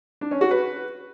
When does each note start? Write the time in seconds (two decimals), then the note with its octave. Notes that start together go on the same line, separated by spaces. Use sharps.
0.21 D4
0.31 C#4
0.41 F#4
0.51 B4